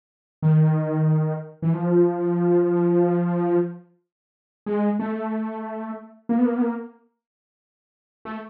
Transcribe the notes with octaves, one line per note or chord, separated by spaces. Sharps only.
D#3
E3
F3
G#3
A3
A#3
B3
A#3
B3
A#3
A3